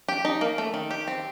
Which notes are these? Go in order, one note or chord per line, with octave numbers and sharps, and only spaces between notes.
G4
D#4
A#3
A3
D#3
G4
C4